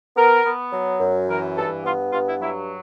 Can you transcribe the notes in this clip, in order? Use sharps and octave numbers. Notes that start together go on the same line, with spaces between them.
B3 A#4
B3
F#3
F#2
E3 A#4
G2 A4
B3 F4
G2 F4
E4
F#3 E4